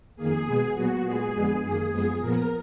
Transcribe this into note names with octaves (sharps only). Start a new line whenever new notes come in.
F2 D#3 A#3 G#4
B2 G#3 B3
A#2 F#3 B3 F#4
A#2 G#3 B3 G#4
F2 D3 G#3 B3
F#2 D#3 A#3 G#4
F#2 F3 G#3 B3
A#2 F3 B3 A#4